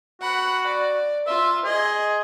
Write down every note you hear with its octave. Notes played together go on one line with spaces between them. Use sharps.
F#4 F#5 B5
D5
F4 E5 C6
G#4 D#5 C6